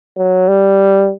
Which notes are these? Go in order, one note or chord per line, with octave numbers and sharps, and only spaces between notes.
F#3
G3